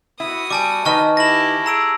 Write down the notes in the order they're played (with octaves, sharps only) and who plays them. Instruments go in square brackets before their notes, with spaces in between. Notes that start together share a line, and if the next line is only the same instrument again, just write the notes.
[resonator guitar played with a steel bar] E4 [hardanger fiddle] F#4 D#6
[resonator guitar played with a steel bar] G3 [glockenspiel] G#5 A5 D6
[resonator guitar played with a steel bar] D#3 D#4 B4 [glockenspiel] A5 C#6 F6
[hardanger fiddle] E4 G4 [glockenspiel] A#6 F#7
[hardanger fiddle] G#4 [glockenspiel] A#5 E6 D7